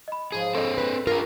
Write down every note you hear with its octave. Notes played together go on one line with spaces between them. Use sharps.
D#5 B5
G#2 F3 G#4 C6
C4 A4 C5 C#5 D#5
B4
G2 F4 G#4 A#4 A#5